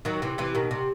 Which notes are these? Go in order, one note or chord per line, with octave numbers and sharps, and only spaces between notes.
D#3 F#3
C3 E3
C3 E3
B2 D#3
C3